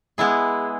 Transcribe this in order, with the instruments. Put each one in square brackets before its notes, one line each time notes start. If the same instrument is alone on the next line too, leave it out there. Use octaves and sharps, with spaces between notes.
[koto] G#3 B3 E4 G#4